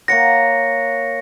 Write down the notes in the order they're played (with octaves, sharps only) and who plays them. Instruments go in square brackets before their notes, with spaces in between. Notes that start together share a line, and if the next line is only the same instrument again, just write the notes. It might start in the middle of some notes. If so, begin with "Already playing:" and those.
[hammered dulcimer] A#3 C#5 F#5 [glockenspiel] A#6 C#7